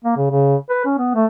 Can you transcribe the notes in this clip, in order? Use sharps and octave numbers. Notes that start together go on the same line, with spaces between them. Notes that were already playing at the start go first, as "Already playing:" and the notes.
A#3
C#3
C#3
B4
C#4
B3
A3